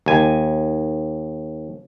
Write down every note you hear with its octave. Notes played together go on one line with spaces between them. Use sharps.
D#2 G#5